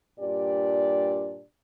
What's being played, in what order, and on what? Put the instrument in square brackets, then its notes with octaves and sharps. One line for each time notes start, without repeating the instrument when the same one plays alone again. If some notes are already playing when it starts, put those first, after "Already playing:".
[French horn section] G2 A#2 D4 G4 D5